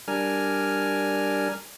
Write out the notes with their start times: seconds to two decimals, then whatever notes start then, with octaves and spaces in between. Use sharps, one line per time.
0.08 G3 D4 A#4 G#5 F6